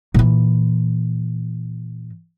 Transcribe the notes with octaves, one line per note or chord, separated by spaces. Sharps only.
A#2 E3